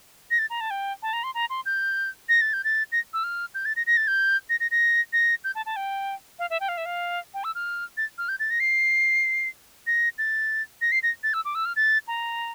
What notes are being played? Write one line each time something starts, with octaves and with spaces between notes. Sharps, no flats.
A#6
A6
A#5
A5
G5
A5
A#5
C6
A#5
C6
G6
A#6
A6
G6
A6
A#6
E6
F6
G6
A6
A#6
A#6
A6
G6
A#6
A#6
A#6
A#6
G6
A5
A5
G5
F5
E5
G5
F5
E5
F5
G5
E6
F6
A6
F6
G6
A6
A#6
C7
A#6
A6
A#6
C7
A#6
A6
E6
D6
E6
F6
A6
A#5